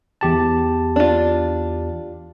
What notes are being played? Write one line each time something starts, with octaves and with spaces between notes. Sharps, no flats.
E2 G4 A5
D4 F4